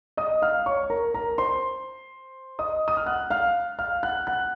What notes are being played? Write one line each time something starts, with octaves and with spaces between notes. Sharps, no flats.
D#5 D#6
F5 F6
C#5 C#6
A#4 A#5
A#4 A#5
C5 C6
D#5 D#6
D#6
F6
F#5 F#6
F5 F6
F5 F6
F#5 F#6
F#5 F#6